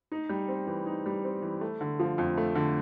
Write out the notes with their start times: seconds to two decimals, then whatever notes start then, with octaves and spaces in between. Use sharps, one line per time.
0.12 D#4
0.29 G3
0.48 C4
0.67 E3
0.86 D#4
1.06 G3
1.25 C4
1.42 E3
1.61 A3
1.81 D3
2.00 F3
2.18 F2
2.37 A3
2.55 D3